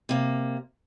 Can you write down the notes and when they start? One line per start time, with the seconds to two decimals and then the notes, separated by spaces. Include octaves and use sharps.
0.09 C3 A#3